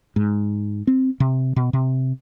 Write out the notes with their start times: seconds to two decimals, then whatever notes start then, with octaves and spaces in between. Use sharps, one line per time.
0.16 G#2
0.87 C4
1.20 C3
1.56 B2
1.73 C3